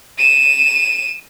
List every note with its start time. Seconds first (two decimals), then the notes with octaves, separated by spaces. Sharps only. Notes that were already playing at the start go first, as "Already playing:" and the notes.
0.18 D#7 E7